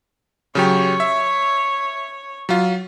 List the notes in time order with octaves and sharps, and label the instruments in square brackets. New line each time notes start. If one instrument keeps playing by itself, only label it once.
[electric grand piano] C#3 F#3 G4 [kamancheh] C#5
[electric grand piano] E5
F#3 F4